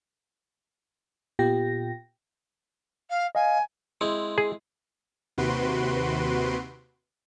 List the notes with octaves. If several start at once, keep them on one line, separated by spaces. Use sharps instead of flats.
A#2 B3 F4 G4 G5 A#6
F5
D#5 F5 G#5
G#3 C4 E4
G#4
D#2 C3 F#4 B4 C6 D7